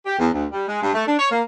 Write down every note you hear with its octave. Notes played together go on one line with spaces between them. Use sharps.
G4
E2
D2
G3
G#3
G2
A3
D4
C#5
A#3